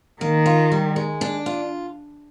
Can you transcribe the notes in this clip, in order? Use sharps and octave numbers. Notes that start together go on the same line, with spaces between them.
D#3 A#3
F4
G3
G#3
D4
F4